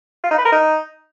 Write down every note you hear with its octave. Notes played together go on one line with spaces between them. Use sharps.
F4
D#4
B4
A#4
D#4